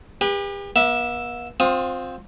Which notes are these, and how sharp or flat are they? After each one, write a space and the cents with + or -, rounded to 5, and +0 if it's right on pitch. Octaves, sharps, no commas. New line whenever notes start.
G4 +40 B4 -20
B3 -45 E5 +0
C4 +5 F4 +30 D#6 +0